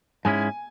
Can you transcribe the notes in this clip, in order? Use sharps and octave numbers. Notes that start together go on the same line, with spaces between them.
G#2 G#3 C#4 E4 G#5